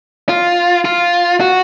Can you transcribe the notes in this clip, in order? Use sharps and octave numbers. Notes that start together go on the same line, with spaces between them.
F4
F4
F#4